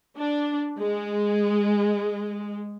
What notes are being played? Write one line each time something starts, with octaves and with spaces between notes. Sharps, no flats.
D4
G#3